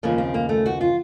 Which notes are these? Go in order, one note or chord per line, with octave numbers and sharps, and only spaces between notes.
D#2 C#3 F3 A#3
C4
A#3
A3
F#4
F4